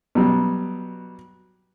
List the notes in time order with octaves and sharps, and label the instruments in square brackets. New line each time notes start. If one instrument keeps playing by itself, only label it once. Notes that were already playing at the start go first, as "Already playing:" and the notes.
[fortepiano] B2 F#3 G3